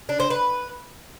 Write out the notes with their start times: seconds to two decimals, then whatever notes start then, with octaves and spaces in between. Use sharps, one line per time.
0.09 D4
0.20 C5
0.30 B4